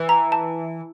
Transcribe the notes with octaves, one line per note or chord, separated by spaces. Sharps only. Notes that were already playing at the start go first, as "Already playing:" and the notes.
Already playing: E3
A#5
A5